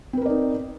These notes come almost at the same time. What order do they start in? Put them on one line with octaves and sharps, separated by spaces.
C4 B4 A#4 D5 D#4